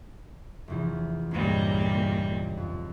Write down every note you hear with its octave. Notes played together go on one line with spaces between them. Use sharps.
F1 E2 E3
C#2 G2 A#2 G3 G#3 B5
F2